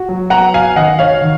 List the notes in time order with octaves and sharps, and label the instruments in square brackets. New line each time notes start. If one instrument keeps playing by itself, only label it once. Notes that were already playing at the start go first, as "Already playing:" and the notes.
Already playing: [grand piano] F#4
F#3
[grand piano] B3 [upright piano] F#5 A#5
[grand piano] F#4 [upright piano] F5 G#5
[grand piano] D#3 [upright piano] D#5 F#5
[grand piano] D#3 [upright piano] C#5 F5
[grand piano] D#3